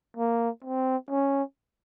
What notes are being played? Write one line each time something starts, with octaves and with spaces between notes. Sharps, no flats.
A#3
C4
C#4